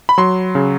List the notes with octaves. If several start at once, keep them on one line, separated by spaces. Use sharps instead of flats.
B5
F#3 C6
C#3